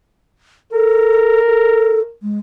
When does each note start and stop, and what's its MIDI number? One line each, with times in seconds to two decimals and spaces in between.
0.72 1.46 69
0.72 2.13 70
1.46 2.01 69
2.23 2.39 56